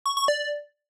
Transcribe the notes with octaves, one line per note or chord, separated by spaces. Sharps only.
C#6
C#6
D5